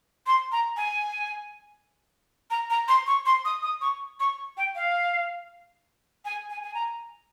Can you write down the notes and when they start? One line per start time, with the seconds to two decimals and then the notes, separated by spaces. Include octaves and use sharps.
0.27 C6
0.52 A#5
0.77 G#5
2.51 A#5
2.70 A#5
2.88 C6
3.07 C#6
3.26 C6
3.45 D#6
3.63 D#6
3.81 C#6
4.20 C#6
4.57 G5
4.75 F5
6.25 G#5
6.50 G#5
6.63 G#5
6.74 A#5